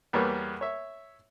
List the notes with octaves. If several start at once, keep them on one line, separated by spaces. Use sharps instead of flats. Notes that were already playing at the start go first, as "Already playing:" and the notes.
E2 G3 A#3 B3 C#5
C#5 E5